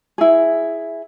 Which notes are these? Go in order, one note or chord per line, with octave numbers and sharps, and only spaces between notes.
E4 G#4